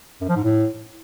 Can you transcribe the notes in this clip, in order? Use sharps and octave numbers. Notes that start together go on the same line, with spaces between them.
F#2
F3
G#2
A2